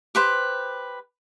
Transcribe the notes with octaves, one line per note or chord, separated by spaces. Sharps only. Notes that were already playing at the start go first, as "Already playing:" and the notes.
G4 B4 C5